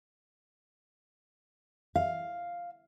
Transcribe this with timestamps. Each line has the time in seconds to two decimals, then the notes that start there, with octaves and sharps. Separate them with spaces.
1.96 F5